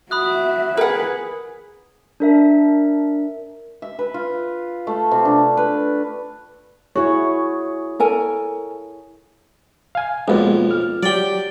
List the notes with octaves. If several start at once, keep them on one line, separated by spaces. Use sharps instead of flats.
F#4 E5 B5 D#6 F#6
G#4 A#4 B4 F#5
D4 A#4 E5
E5
B4
F4
A3
C3
D4
B4
E4 F#4 G#4 C#5
A4 A#4 G#5
F5 G#5
B1 F2 G#3 A#3 B3
F6
F#3 G4 D5 G5